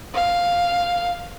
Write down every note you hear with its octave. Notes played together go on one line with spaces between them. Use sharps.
F5